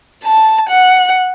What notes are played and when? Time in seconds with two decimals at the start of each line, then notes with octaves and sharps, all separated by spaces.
0.24 A5
0.70 F#5